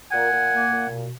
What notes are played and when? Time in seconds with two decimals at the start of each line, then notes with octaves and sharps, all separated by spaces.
0.11 A#2 F#5 G#5
0.32 A#2
0.51 A#3
0.70 A#2
0.90 B2